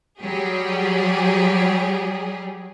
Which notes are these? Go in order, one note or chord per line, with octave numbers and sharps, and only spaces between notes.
F#3 G3 G4 G#4